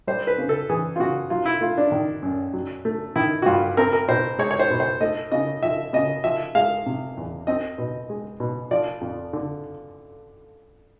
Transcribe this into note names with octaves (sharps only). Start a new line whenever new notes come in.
G3 C5
B4
C#3
A4
E3 G#4
F4
C#3 F#4
F#3 F4
E4
A3 F4
D4
D#3
F#2
F#3
A3
D#3 E4
F#4
G2 F4
C4 A#4
A#4
B2 C5
G#3 C#5
C#5
C5
B2
C5
A3 D#5
C#3 D#5
F3 E5
C#3 D#5
F3 E5
G#3 F5
C3
E2
C4 D#5
B2
G#3
B2
F3 D5
F2
D3